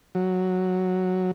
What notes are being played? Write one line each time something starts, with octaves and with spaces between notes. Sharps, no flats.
F#3